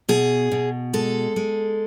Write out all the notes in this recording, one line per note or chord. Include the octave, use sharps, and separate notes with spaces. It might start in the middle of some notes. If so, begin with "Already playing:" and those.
B2 G#4
B2
G#3 A4
G#3